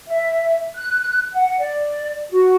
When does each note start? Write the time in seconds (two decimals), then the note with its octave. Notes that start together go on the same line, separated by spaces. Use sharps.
0.07 E5
0.76 F#6
1.34 F#5
1.59 D5
2.30 F#4